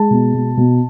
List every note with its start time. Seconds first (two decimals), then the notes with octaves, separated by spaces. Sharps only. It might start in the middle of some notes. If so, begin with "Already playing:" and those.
Already playing: G#3 A5
0.11 B2
0.34 B2
0.57 B2